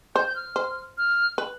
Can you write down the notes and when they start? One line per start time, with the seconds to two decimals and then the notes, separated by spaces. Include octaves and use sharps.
0.15 C5 G6
0.27 G6
0.36 F6
0.56 C5
0.98 F6
1.38 B4